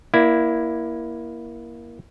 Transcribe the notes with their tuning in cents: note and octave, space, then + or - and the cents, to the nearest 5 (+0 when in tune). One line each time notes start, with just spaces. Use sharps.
A#3 +20 E4 +0 D5 +0